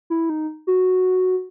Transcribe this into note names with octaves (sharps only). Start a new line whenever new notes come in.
E4
D#4
F#4